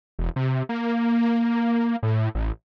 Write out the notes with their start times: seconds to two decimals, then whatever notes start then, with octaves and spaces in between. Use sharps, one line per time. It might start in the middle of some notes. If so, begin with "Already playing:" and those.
0.19 E1
0.36 C3
0.69 A#3
2.03 A2
2.35 A1